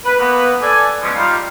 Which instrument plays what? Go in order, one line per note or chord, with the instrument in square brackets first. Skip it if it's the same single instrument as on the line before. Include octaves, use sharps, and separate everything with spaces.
[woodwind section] B4
A#3 B3 B4
A4 D5 G#5
B2 F3 G#3 C#4
G3 D#4 F4 F5